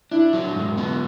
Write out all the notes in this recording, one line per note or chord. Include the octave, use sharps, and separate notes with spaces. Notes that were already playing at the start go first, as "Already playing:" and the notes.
D4 E4
F#3
G#2
B3